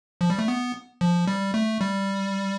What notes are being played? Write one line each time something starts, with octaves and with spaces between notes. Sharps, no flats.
F3
G3
A3
B3
F3
G3
A3
G3